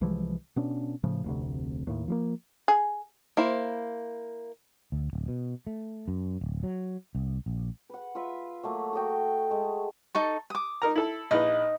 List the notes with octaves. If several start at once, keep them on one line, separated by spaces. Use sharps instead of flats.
C2 E3 F3 G#3
B2 B3 C#4 D4
A2 C#3 F3
F1 D2 C3
D#2 A2
F3 G3 A#3
G#4
A#3 E4 C5
D2
D1
B2
A3
F#2
D1
F#3
C2
A#1
B4 F#5
F4 B4 E5
F#3 A3 A#3
F#4 A4 D#5 G5
G#3 A3
D#4 A4 C#6
D6 D#6
D#4 A#4 A#5
E4 A4 A5
A#1 D#4 E4 B4 D#5